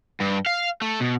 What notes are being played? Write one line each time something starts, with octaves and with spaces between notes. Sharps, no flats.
G2
F5
A3
B2